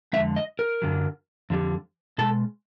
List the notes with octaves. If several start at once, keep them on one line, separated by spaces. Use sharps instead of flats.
F2 D3 F3 G#3 E5
D#5
A#4
F#2 D3 F#3
F2 D3 G3
B2 G#3 A4